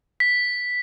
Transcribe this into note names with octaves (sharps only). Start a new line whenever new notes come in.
B6